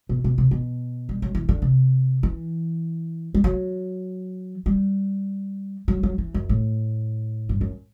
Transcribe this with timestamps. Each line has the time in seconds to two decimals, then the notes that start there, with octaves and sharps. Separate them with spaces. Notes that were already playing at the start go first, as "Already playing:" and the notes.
0.09 B2
0.24 B2
0.38 C3
0.51 B2
1.09 G3
1.22 F#3
1.35 E3
1.49 D3
1.62 C3
2.23 E3
3.34 G3
3.44 F#3
4.66 G3
5.88 F#3
6.03 F#3
6.18 E3
6.34 F#2
6.49 A2
7.49 G2
7.61 F#2